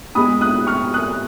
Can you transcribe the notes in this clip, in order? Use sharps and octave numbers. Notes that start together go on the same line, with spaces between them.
A#2 G#3 B3 B5 D#6
D#6 F#6
C#6 F6
D#6 F#6